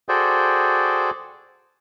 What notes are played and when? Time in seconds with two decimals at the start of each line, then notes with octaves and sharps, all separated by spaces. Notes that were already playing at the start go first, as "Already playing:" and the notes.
0.09 F#4 G#4 A4 C5 D5 G5